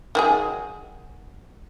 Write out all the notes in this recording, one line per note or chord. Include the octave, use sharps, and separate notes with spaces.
D#3 F#3 G#4